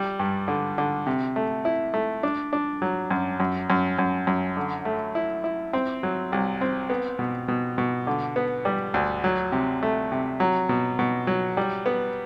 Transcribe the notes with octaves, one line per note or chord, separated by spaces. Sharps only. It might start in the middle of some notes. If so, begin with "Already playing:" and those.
Already playing: G3
G2
D3
D3
C3
A3
E4
A3
D4
D4
F#3
F#2
F#2
F#2
F#2
F#2
D3
A3
E4
E4
C4
F#3
C2
C4
B3
B2
B2
B2
D3
B3
G3
D2
F#3
C3
A3
C3
F#3
B2
B2
F#3
G3
B3